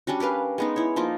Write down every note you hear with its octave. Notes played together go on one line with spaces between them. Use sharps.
G3 C#4 D4 F#4
G4 A#4 B4 F5
G#3 B3 D#4
E4 C#5
F3 A#3 D#4 F4